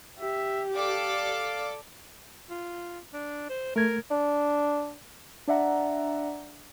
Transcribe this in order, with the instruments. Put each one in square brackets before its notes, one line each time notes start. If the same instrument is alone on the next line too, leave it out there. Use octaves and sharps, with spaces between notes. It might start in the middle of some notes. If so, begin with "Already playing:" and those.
[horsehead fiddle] G4 [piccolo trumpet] E5
[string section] A4 D5 D6 [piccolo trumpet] F5
[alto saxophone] F4
D4
C5
[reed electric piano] A3 G#6 [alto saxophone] A#4
[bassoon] D4
[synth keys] D4 D5 E5 F#5 A#5